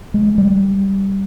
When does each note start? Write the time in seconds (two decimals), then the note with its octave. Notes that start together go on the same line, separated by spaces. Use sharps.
0.14 G#3
0.38 G3